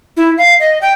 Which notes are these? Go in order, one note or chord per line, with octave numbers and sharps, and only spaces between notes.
E4
F5
D#5
G5